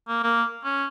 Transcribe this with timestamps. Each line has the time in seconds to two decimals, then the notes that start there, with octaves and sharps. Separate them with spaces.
0.08 A#3
0.23 A#3
0.64 C#4